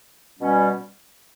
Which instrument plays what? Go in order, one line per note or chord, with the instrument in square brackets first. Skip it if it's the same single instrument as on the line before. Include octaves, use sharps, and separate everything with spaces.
[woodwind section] B2 G3 C#4